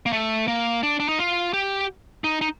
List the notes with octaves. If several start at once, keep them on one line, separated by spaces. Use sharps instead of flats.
A#3
A3
A#3
D4
D4
D#4
F4
G4
D#4
D#4